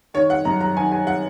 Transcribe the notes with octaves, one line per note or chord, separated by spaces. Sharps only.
D#3 C#5
F#5
F#2 A#5
A#5
D#3 G#5
G#5
F#5